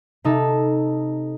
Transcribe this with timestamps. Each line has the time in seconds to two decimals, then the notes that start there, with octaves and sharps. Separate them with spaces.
0.24 C3 D#4 A4